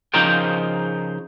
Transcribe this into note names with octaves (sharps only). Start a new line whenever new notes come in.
C#3 F3 D#4 A#4 C5 G5